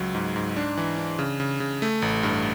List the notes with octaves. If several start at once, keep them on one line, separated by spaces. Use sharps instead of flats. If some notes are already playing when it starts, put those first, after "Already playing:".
Already playing: C#2 F#3
G#2
G#2
D4
E3
D4
C#3
C#3
C#3
A3
A1
G2